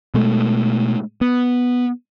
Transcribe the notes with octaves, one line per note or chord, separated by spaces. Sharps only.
B2 G#3 A3
B3